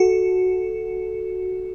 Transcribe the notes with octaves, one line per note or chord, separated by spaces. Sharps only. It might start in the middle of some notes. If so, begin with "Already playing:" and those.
Already playing: F#4 A4